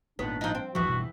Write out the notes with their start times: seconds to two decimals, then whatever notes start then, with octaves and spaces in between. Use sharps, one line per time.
0.19 G#1 D#2 A#2 B3 D4 C#5
0.41 F3 D#4
0.55 C4
0.75 D#1 A#1 E2 G2 E3 F3 F#4
0.89 B2